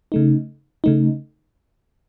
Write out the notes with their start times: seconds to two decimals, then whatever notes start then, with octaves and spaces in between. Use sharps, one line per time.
0.12 C#3 A3 D#4
0.84 C#3 A3 D#4